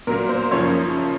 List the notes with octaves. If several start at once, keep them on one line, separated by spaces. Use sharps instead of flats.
A#2 F#3 A#3 A#4
C5
F#2 C#3 F3 C#5